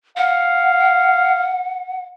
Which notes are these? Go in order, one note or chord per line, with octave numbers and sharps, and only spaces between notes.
F5 F#5